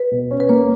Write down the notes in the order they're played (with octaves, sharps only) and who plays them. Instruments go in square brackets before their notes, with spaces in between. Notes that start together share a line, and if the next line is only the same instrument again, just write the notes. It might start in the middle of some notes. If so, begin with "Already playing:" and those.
Already playing: [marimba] B4
[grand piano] B2
C#4
[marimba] B4
[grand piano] A#3 [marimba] C#5